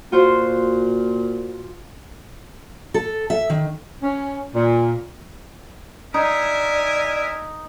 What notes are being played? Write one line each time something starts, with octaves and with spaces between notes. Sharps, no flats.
A#2 F4 F#4 C5
A4
E5
D#3
C#4
A#2
D#4 A#4 D5 E5 G#5